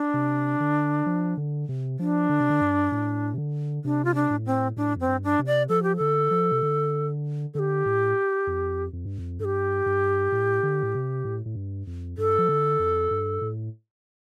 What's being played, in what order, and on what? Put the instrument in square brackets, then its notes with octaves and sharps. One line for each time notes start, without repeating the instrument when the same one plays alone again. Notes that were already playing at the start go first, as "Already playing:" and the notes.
Already playing: [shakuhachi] D4
[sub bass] C3
D3
F3
D3
C3
[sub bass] F3 [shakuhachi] D4
[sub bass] D3
C3
D3
G2
A2
C3
D3
[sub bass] C3 [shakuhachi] D4
[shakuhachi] F4
D4
[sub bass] A2
[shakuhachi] C4
[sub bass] A2 [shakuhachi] D4
[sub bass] F2 [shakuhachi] C4
[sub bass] G2
[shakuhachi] D4
[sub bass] C3
[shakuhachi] D5
[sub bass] F3 [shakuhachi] A4
[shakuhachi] G4
[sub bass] D3 [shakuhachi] A4
[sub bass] F3
C3
D3
[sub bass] D3 [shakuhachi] G4 A4
[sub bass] A2
F2
F2
G2
F2
[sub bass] G2 [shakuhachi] A4
[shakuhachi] G4
[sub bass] G2
A2
D3
A2
C3
A2
A2
G2
F2
[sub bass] G2 [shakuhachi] A4
[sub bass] F3
D3
F2
G2
A2